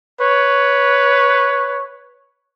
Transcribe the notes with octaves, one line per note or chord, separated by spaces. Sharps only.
B4 C#5